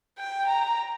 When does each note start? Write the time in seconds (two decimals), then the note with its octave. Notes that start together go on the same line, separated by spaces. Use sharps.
0.19 G5
0.47 A#5